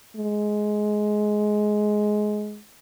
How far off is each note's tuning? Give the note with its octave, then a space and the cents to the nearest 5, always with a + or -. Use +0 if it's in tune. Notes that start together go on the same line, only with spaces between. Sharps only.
G#3 +15